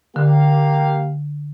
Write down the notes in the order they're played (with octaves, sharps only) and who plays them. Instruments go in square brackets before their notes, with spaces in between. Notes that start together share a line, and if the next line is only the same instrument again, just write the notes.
[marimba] D3 [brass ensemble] A#3 G4 F5